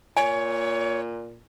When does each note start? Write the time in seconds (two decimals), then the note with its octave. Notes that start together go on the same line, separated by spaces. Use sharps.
0.17 A#2 C#5 G#5